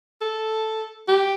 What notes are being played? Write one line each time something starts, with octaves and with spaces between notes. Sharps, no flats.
A4
G4